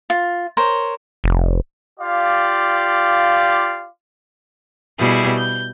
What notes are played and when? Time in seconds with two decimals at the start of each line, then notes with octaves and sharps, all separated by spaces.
0.10 F4
0.57 A#4 C5 C#5
1.24 F1
1.99 F4 G4 D5 F5
4.98 B2 G3 E4 G#4
5.37 G6